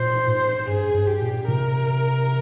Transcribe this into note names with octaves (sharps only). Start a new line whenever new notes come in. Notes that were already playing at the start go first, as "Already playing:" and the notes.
Already playing: A#2 C5
G#2
G2 G#4
G2
G4
A#2
C3 A#4